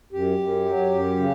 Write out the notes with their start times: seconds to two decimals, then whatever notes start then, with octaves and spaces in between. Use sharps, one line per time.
0.13 F#2 G4
0.38 F#2
0.65 F#3
0.92 F#2
1.17 C#3